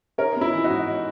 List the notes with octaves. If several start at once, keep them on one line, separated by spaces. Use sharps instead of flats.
D#4 A#4 C#5
B3
E4
E3
D#4 F#4
G#2
D#4